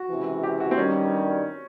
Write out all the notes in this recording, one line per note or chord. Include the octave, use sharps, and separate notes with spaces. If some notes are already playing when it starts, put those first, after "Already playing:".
Already playing: F#4
C#2 C3 E3
G4
F#4
C4
G2 D#3 G3 C#4